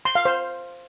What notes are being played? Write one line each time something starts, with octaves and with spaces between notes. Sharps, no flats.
C6
F5
C5